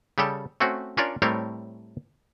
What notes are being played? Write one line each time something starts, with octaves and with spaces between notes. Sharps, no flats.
C#3 G3 G4 A4
A3 C4 C#4 F#4
C#4 D4 F4 A#4 C#5 D5
A2 G3 A3 C4 A#4 C#5